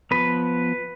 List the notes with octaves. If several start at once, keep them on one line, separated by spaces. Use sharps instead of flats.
F3 B3 B4